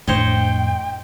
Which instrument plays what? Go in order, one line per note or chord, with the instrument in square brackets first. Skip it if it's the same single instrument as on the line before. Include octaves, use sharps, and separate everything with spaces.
[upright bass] F2 D4 [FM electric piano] A2 [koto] C5 C#5 D#5 [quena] G5